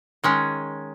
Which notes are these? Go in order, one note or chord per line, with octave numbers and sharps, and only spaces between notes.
D#3 G#3 C#4